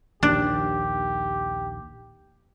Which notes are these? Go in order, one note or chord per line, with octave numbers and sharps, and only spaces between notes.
A#1 D#2 D4 G4